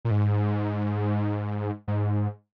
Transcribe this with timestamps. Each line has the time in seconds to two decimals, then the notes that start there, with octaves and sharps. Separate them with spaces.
0.05 A#2
0.11 G#2
1.88 G#2